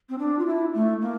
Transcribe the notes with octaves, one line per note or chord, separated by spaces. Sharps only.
C4
D4
F4
E4
A3
A#3